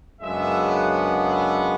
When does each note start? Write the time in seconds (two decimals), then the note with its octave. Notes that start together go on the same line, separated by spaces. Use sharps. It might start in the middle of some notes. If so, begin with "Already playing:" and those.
0.21 F#2 C#3 G#3 B3 D4 E5
0.71 F#5
1.20 E5